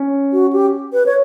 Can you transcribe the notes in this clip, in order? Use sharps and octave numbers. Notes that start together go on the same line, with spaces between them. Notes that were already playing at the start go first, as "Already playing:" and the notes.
Already playing: C#4
F#4
G4
B4
C#5